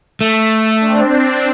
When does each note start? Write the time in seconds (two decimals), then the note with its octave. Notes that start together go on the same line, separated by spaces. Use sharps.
0.21 A3
0.81 C4 D4